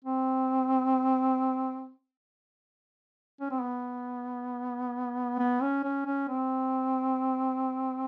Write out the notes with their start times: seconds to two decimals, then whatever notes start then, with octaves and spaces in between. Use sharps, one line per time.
0.05 C4
3.41 C#4
3.51 C4
3.61 B3
5.39 B3
5.62 C#4
5.84 C#4
6.06 C#4
6.28 C4